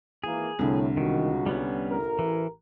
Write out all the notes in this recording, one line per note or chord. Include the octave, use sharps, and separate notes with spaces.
G#1 E3 A#3 G#4
C2 A2 D3
C#2 D#3 F#4
G3 B3 C#4
A1 A#4
E3